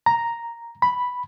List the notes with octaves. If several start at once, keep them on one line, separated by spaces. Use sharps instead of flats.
A#5
B5